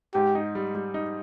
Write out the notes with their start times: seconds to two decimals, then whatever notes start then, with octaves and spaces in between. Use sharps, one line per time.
0.14 G#2 G4
0.35 D#4
0.55 G3
0.75 G3
0.94 D#4